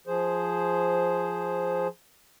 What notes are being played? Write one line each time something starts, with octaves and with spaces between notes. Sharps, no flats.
F3 G#4 C5